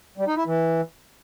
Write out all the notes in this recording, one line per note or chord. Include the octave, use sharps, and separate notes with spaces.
G3
D#4
E4
E3